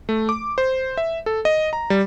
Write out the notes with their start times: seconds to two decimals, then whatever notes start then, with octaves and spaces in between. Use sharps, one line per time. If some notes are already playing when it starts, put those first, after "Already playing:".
0.09 A3
0.29 D6
0.58 C5
0.97 E5
1.26 A4
1.45 D#5
1.73 A#5
1.90 G3